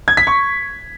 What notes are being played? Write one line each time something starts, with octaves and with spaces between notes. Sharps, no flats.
G#6
B6
C#6